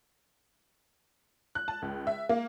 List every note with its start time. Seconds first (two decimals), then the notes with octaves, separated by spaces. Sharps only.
1.55 F#6
1.68 A5
1.82 C#2
2.07 E5
2.29 A#3